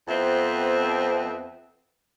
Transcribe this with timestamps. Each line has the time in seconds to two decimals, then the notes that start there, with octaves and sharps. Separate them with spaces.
0.08 F2 B3 C4 E5